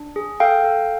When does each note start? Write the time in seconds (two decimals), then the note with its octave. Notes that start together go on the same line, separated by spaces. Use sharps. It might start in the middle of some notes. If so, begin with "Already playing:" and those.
Already playing: D4
0.16 G#4
0.40 A4 F5 G5
0.64 A4